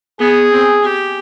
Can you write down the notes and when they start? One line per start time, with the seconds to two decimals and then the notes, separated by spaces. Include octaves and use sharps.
0.19 B3 G#4
0.51 C4
0.82 G4